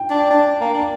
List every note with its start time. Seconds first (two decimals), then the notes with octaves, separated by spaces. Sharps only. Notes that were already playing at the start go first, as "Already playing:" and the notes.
Already playing: G5
0.10 D4
0.31 D4
0.61 A#3
0.74 D4